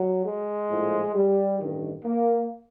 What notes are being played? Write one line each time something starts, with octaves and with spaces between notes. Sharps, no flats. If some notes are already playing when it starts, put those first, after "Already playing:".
Already playing: F#3
G#3
A#1 A2 F3
G3
A1 G2 D#3
A#3